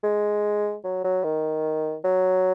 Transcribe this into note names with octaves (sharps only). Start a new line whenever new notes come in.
G#3
F#3
F#3
D#3
F#3